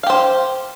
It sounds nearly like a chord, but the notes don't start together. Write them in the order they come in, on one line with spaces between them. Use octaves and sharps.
F5 G4 C5